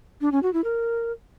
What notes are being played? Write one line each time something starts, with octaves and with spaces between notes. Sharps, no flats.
D4
C#4
F#4
E4
A#4